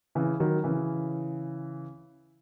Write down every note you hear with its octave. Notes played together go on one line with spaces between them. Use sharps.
C#3 E3
D#3 F#3
C#3 E3